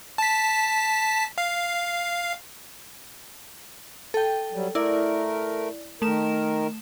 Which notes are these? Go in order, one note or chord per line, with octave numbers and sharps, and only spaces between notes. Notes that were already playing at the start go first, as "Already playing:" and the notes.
A5 B6
F5
A4 G5
F#3 G3
A3 E4 A#4 D5
D#3 A3 A#4 E7